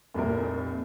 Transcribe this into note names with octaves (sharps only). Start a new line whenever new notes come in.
F1 C2 A#2 A#4